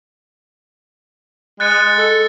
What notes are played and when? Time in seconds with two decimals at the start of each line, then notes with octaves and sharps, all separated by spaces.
1.60 G#3 F#6 A6 C#7
1.98 A4